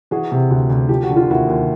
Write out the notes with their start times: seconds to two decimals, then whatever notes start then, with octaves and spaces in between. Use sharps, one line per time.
0.11 E3 F#4 G#4
0.32 C3
0.50 D2
0.70 D2
0.89 F3 G4
1.03 F#4
1.09 D3
1.16 F4
1.28 D#2 E4 F#4
1.48 D#2